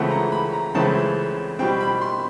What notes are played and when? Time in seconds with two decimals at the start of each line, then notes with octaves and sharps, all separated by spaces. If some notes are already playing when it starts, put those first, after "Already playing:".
Already playing: C#2 C#3 E3 A3 C4 F#5
0.11 A#5
0.32 B5
0.53 A#5
0.74 C#2 C#3 E3 A3 C4 A5
1.59 B2 G3 C4 G5
1.81 B5
2.01 C6